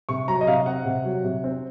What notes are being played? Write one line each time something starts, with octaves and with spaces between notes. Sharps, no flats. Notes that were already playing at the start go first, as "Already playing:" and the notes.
C3 C#6
F#3 A#5
D#5
C3 F5
C4 F#5
C3
F#3
C3
C4